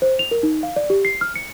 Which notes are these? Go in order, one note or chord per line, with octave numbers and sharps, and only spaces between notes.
C5
F7
A#4
D#4
F5
D5
G4
C7
F6
C#7